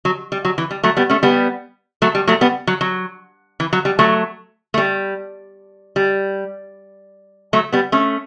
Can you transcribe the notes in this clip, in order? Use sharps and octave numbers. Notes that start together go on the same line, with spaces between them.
F#3
G3
F#3
E3
G3
F#3 A3
G3 B3
A3 C#4
G3 B3
F#3 A3
G3
F#3 A3
G3 B3
F#3
F#3
E3
F#3
G3
F#3 A3
A3
G3
G3
F#3 A3
G3 B3
A3 C#4